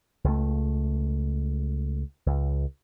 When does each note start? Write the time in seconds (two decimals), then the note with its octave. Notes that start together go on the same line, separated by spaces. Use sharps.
0.24 C#2 A3
2.26 C#2